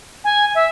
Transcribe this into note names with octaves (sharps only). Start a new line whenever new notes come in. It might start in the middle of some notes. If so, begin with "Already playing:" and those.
G#5
E5